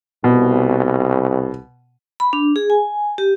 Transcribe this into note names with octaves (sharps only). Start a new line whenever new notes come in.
C2 B2
B5
D4
G#4
G#5
G4